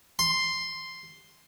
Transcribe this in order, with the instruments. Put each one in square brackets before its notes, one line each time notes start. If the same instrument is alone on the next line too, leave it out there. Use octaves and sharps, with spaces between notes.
[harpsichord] C6